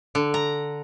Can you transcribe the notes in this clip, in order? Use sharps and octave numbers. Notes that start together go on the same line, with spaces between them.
D3
A#5